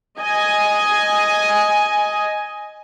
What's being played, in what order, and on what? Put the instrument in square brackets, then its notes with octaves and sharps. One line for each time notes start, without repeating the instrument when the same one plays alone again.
[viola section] D#5 G#5